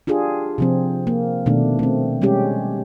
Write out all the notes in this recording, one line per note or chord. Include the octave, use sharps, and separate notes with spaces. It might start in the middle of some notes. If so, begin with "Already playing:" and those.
D4 F4 G4 G#4
C3 F3 C4
A#3
B2 D#3 A3 D4
A3 C4
G3 G#3 C#4 G4